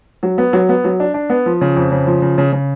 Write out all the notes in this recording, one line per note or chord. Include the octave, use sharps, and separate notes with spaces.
F#3
B3
F#3
B3
F#3
D4
D4
B3
F3
C#3
F2
C#3
F3
C#3
C#3
C#3